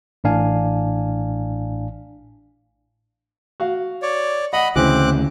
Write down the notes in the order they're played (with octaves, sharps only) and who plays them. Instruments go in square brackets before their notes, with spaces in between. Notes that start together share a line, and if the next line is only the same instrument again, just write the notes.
[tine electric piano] A1 A2 D4 F5 G#5
[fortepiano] F#4 F5
[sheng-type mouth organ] C#5 D5
[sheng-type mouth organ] D#5 B5 [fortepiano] F#5
[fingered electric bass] D2 C#3 [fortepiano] E3 [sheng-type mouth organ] C4 D6 F#6